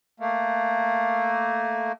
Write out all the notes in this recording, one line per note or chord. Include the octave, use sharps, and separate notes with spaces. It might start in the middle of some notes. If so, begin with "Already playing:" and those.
A3 A#3